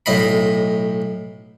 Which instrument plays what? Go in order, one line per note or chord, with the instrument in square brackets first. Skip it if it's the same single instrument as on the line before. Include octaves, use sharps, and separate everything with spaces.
[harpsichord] B1 A2 D#5 B5